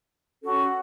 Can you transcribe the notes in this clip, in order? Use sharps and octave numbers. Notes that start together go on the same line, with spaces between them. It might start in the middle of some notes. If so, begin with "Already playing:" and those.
C#4 F#4 A4